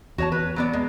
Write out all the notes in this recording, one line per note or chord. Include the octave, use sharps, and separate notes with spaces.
E2 F#4 C#5 A5
B4
F#3 B3 D5
G#3